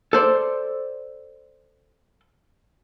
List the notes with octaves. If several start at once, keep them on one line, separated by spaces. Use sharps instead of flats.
A4 C5 D5